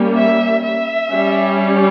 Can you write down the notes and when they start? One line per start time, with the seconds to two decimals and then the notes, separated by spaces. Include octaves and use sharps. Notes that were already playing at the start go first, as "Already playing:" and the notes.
Already playing: G3 A#3 C#4
0.15 E5
0.63 E5
1.11 G3 C#4